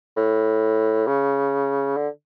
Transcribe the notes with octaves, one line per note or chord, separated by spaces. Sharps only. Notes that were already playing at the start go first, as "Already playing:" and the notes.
A2
C#3
D3